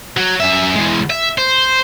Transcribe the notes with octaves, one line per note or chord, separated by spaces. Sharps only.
F#3
F#2 E5
E2 G#3
E5
C5